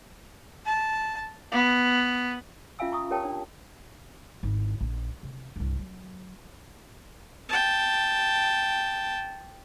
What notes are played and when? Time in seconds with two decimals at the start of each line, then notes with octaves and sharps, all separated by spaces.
0.66 A5
1.52 B3
2.79 C#4 F4 E5 F5 G#5 E6
2.92 A#5 C#6 D#6
3.10 G4 A#4 C#5 G5 A5
3.24 D4 C#5
4.43 G#1 E4
4.81 A#1
5.23 C3
5.56 C2 G2
5.79 F#3
7.49 G5 A5